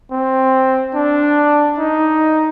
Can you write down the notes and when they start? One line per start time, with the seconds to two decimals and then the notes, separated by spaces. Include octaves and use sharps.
0.11 C4
0.95 D4
1.78 D#4